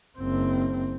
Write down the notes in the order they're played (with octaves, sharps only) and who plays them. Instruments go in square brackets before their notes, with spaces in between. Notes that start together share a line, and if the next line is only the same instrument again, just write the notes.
[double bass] F#1 C4